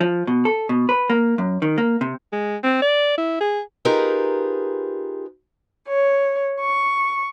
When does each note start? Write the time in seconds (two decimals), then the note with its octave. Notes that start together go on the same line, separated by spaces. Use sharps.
0.01 F3
0.27 B2
0.45 A4
0.69 B2
0.89 B4
1.10 A#3
1.38 F#2
1.62 D#3
1.78 A#3
2.01 C3
2.33 G#3
2.63 C4
2.82 D5
3.18 E4
3.41 G#4
3.85 D#4 F4 G4 G#4 A#4 B4
5.87 C#5
6.60 C#6